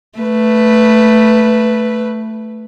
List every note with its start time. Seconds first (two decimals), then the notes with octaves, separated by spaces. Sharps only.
0.18 A3 B4